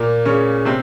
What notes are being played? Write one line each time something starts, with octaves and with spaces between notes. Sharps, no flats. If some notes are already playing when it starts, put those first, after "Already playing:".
Already playing: A#2 A#3
C#3 C#4
C3 C4